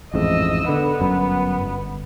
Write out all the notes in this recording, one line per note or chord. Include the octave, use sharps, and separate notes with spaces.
A1 F2 G#2 D#5 E6
D3 B3
G1 F#2
G1